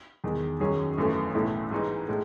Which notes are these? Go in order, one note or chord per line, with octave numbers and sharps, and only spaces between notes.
E2 D#3 G#3
F#2 D#3 F#3 C#4 G#4
G#1 F#2 E3 A3
B1 A2 E3 A3 E4
G#2 E3 G#3 D#4
A2 G#3